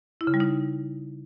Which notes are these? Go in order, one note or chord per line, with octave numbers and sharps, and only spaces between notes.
E4
C#3
G3
D#4